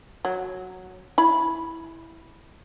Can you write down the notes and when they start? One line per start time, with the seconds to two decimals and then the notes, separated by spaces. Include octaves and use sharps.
0.25 F#3
1.18 E4 B5